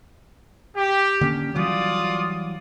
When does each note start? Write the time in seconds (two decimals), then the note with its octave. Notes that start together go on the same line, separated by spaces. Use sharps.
0.75 G4
1.21 D3 A#3 C#4
1.55 E3 F#3 G3 F4 D5 D#6